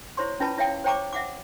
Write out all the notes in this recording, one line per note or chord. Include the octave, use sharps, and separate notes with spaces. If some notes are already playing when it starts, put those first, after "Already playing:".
E4 C5 C#5 C6 C#6
C#4 E4 F4 B4 A5 B5
E4 C#5 E5 F5 G5
C5 C#5 G5 A#5 C#6 D6
E5 F#5 D6